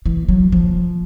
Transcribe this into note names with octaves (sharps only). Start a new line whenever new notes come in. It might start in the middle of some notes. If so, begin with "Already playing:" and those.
E3
F#3
F3